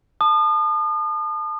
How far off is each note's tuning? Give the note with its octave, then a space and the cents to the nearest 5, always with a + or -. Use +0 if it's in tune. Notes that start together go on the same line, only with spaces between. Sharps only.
A5 +0 D#6 -40